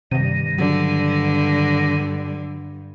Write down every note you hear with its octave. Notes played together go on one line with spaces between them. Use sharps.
G2 C3 D#3
D3 F#3